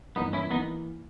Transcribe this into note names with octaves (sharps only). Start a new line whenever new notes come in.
G1 G2 E3 A#3 B3 D#4
C#4 E4
E3 A#3 B3 D#4